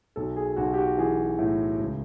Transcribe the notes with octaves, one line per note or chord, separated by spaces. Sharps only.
B1 A4
G#4
B1 F#4
G4
F#4
E3 G#4
A2
C#2